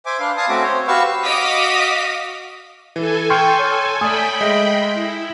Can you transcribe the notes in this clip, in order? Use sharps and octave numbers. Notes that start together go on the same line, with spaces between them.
C5 E5 G#5 D6
D4 B4 F5 C6
F5 G#5 A5 D#6
A3 C4 C#4 F#4 E5 D6
C5 C#5
F#4 G4 B4 F5 C#6 E6
F#4 D#5 F5 D6 D#6 B6
E3 A4 G#5
G5 C6 C#6 F6
C#5
A3 D5 G5 G#5 B5 D#6
G#3 D#5 E5
E4